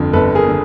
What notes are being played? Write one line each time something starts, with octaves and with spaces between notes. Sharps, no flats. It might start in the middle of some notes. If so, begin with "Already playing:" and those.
Already playing: G1 F2 D3
G1 A4 B4
G#4 A#4
D3